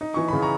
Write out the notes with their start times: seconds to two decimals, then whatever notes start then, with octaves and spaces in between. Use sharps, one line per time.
0.01 D#4
0.14 E3 C#6
0.28 C#3 B5
0.42 A#5 C#6